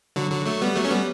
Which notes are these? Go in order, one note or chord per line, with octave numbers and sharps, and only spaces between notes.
D3 F#3
D3 F#3
F#3 A3
G3 B3
F#3 A3
C#4
G3 B3